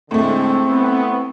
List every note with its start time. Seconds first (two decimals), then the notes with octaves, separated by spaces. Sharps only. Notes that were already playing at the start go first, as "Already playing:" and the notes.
0.11 A2 D3 G#3 A3 C4
0.69 B3